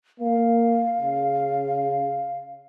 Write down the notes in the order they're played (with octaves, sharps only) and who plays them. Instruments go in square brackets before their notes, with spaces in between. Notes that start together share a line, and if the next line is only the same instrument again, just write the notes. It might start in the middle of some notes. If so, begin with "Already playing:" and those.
[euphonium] A#3 [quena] F5
[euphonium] C#3